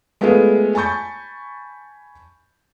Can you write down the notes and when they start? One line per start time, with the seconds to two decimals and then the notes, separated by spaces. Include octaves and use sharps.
0.21 G#3 A3 B3 F4 G#4
0.75 G#5 A5 B5 C#6 G6 A6